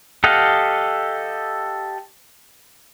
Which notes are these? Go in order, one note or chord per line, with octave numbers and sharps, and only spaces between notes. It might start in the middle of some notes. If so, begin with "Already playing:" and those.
G4 A4 D#5 F5 F#5